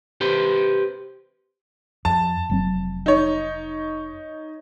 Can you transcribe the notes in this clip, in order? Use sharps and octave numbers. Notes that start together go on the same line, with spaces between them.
G4 B4 C5
F2 A5
F1 F#3 C4
D#4 C#5